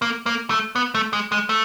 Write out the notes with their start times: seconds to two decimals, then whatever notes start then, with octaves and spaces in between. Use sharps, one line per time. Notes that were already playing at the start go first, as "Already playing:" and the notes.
0.02 A#3
0.26 A#3
0.50 A3
0.76 B3
0.95 A3
1.13 G#3
1.32 G#3
1.49 A3